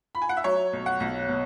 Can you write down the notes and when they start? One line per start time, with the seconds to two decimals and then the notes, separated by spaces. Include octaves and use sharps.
0.15 B5
0.22 G#5
0.29 F#5
0.37 E5
0.44 F#3 C#5
0.73 B1
0.86 F#5
1.00 B1
1.29 B2